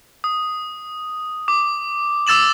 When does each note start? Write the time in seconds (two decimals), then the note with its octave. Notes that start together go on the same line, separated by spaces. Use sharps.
0.24 D#6
1.48 D6
2.27 D6 E6 A6 E7 F#7